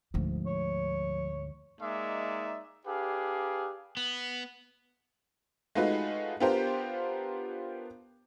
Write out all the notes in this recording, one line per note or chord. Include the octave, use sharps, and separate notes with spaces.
D2 G#2 F3
C#5
G#3 A#3 D#4 D5 E5
D4 G4 G#4 B4 F5
B3
G#3 A3 D#4 F4 F#4 B4
B3 D4 F4 G4 A#4 C5